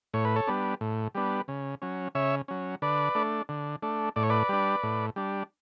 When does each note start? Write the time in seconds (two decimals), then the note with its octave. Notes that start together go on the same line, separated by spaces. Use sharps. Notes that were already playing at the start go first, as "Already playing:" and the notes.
0.14 A2 C#5
0.25 B4
0.36 A4 C#5
0.47 G3 B3 D4
0.81 A2
1.15 G3 B3 D4
1.48 C#3
1.82 F#3 C#4
2.15 C#3 C#5 E5
2.48 F#3 C#4
2.82 D3 B4 D5
3.15 A3 D4
3.49 D3
3.83 A3 D4
4.16 A2 D5
4.23 C#5
4.29 B4 D5
4.49 G3 D4
4.83 A2
5.16 G3 D4